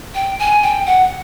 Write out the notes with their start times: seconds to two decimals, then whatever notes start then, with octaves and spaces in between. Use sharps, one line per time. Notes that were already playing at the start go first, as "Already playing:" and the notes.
0.15 G5
0.39 G#5
0.63 G5
0.86 F#5